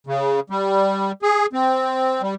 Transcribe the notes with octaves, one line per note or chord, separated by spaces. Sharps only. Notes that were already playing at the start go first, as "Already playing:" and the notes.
C#3
G3
G#4
C4
G3